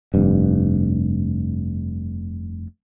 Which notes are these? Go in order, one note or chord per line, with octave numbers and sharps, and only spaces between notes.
F1 G2